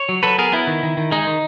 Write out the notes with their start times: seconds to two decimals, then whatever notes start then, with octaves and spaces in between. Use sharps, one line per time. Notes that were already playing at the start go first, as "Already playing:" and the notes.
Already playing: C#5
0.09 F#3
0.23 F#3 A4 B4
0.38 B3 G#4 A#4
0.52 B3 E4
0.67 D#3
0.83 D#3
0.97 D#3
1.11 G#3 D#4
1.27 D#3